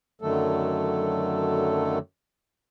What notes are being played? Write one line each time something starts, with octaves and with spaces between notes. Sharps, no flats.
F#2 D3 D#3 F#3 A3 A4